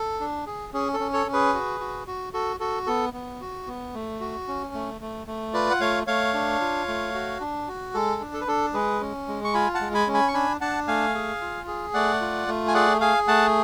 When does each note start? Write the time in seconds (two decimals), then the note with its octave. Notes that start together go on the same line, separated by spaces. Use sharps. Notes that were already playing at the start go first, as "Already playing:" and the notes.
Already playing: A4
0.20 D4
0.47 G#4
0.73 C#4 G#4
0.94 A4
1.00 C#4
1.13 A4 C#5
1.27 C#4
1.33 G#4 B4
1.54 F#4
1.80 F#4
2.07 F#4
2.33 F#4 A4
2.60 F#4 A4
2.87 B3 A4
3.13 B3
3.41 F#4
3.67 B3
3.94 A3
4.20 F#4
4.48 C#4
4.74 A3
5.01 A3
5.27 A3
5.53 F4 B4 D5
5.71 F#5
5.80 A3 C#5 F5
6.07 A3 C#5 F5
6.34 D4
6.61 F4
6.88 A3
7.14 F#4
7.40 D4
7.68 F#4
7.94 G#3 A4
8.21 D4
8.33 A4
8.41 B4
8.47 D4 A4
8.74 G#3 G#4 B4
9.01 C#4
9.28 G#3
9.44 C#6
9.54 F4 G#5 B5
9.74 F#5 A5
9.81 G#3
9.94 G#5 B5
10.07 C#4
10.14 G#5 B5
10.28 C#6
10.34 D4 G#5 B5
10.61 D4 F#5 A5
10.88 A3 F5 G#5
11.15 G#4
11.41 F4
11.68 G#4
11.94 A3 D5 F#5
12.21 F4
12.48 A3
12.68 G#5
12.74 G#4 D5 F#5
13.01 G#4 F5 G#5
13.27 A3 F#5 A5